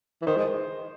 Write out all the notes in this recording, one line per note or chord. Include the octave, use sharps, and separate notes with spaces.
E3
D#3 C5
G#3